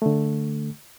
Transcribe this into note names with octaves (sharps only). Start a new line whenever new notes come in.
D3 A3